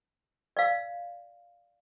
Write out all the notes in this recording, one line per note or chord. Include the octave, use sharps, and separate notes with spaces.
D5 F5